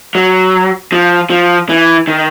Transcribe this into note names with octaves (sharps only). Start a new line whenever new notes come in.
F#3
F3
F3
E3
D#3